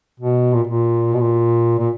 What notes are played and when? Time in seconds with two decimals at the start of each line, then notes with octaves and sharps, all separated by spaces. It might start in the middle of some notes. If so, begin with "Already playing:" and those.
0.20 B2
0.54 A#2
0.68 A#2
1.13 B2
1.21 A#2
1.79 A#2